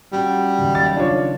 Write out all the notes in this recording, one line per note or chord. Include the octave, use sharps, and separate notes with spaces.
G3 C#4 F#4
F#1 D#2
A6
D4 F4 C#5